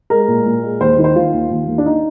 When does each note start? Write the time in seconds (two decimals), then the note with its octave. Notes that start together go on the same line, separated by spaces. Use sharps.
0.10 G#3 A#4
0.28 A#2
0.45 A#2
0.63 G#3
0.81 D#2 C5
0.98 D#3
1.04 C5
1.16 D#3 F4
1.33 D#2
1.51 D#2
1.68 D#2
1.78 D4
1.86 D#4